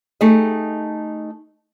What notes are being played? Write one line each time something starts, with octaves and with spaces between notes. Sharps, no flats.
A3 D#4 G4 G#4 D#5